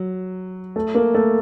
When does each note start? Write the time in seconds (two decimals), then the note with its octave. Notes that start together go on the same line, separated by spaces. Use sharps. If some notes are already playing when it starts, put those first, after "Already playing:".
Already playing: F#3
0.76 A3
0.95 A#3
1.15 A3